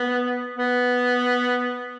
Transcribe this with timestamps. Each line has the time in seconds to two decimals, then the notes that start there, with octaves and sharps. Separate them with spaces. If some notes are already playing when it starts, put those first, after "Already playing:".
Already playing: B3
0.56 B3